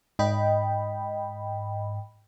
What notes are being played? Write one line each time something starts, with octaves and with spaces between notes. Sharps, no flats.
G#2 D#5 G5 B5